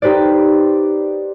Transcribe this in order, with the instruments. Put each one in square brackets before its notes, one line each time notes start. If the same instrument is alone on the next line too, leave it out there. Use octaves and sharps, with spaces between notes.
[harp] D#4 G4 B4 C5 D5